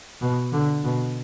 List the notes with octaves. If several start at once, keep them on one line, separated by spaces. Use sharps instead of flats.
B2
D3
B2